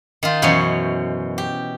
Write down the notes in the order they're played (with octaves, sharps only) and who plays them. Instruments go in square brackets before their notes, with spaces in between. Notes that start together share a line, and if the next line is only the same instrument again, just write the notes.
[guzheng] D#3 D#4 F4
F#2 B2 E3 C5 C#5
G4